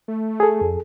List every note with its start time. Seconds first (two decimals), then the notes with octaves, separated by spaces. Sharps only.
0.08 A3
0.40 G#4 A4
0.61 F2